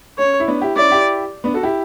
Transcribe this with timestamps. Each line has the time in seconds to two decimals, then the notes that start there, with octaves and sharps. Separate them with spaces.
0.18 C#4 C#5
0.40 E4
0.48 B3 D4
0.61 E4 G4
0.76 C#4 E4 D5
0.91 E4 G4
1.44 B3 D4
1.54 F#4 A4
1.63 E4 G4